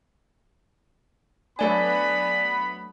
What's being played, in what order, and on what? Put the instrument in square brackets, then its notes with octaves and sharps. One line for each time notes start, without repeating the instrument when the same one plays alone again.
[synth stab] F#3 A3 D4 [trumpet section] B3 B5 [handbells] D5 G#5